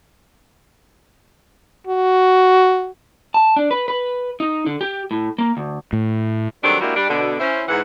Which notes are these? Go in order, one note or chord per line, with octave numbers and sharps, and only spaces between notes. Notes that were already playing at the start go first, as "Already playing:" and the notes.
F#4
A5
D4
B4
B4
D#4
D3
G4
A2
A#3
D2
A2
D#3 F#3 G3 C4 D4 A4
G#3 A#3 D4 E4 F#4 G4
G3 D4
B2 D3
C#4 E4 C5
G#2 E3 F#5